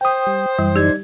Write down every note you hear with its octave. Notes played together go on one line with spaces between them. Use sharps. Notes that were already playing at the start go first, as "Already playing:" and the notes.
C5 G5 D#6
G3
F#2 E3 G3
D#4 G4 D5 G#6